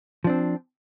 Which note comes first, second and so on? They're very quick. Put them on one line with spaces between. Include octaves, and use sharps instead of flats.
F3 D4 C4